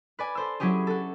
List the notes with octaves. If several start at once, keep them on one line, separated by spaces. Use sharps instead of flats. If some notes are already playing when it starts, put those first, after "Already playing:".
B4 D5 G#5
A4 C5 E6
F#3 C#4 E4 G4 G#4
F#4 A4